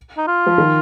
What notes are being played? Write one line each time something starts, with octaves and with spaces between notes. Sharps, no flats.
D#4
F4
F3
D#3